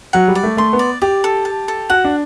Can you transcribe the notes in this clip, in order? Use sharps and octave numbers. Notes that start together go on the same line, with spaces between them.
F#3 F#5
G3
D5
A3
A3 C6
B3
D5
G4 D5
A4
A5
A4
F#4 F#5
D4